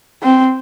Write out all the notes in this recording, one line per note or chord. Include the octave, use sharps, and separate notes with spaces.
C4